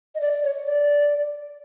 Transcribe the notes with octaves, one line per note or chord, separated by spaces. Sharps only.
D#5
D5
C#5
D5